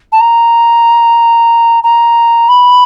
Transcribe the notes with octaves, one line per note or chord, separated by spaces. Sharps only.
A5
A#5
A#5
B5